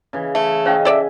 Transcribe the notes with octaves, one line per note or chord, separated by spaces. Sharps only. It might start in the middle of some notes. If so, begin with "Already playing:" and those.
C#3 E3
A3
C#4 E4 C5 D#5 F5 G5
A4 D5 E5